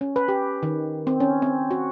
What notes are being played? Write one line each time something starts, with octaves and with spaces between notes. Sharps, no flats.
C#4
B4
G4
D#3
C4
C#4
C4
F#4